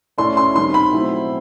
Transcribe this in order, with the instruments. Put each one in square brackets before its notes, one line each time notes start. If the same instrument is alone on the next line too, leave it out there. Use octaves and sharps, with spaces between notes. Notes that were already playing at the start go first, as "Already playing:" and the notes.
[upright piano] A3 C#4 E4 A4 D5 [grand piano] C6
[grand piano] C6
[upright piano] D#3 G3 C4 [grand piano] C6
[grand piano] B5
[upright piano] B2 F#3 A3 C4 E4